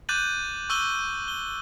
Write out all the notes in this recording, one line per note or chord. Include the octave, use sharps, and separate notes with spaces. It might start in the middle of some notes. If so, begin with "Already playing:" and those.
D6 F#6 G6 A6 D#7 F#7
C#6 E6 F#6 D#7 F#7 G7
G7